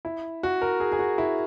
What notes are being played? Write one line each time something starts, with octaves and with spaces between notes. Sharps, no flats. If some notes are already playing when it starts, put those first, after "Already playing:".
E4
F#4
A#4
G#4
G#4
F#4
E4